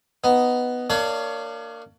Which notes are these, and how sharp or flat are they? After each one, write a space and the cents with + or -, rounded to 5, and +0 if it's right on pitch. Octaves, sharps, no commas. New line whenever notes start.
B3 +5 D#4 +0
A#3 -15 D4 +30 C#5 +25